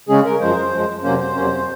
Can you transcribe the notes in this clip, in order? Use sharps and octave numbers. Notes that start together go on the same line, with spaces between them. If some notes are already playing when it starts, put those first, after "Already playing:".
C#3 G#3 C#4 G#4
A#4
F#2 F3 G#3 C5
F#2 F3 G#3
F2 C3 F#3 A#3 C#4 C5
C5
F2 C3 F#3 A#3 C#4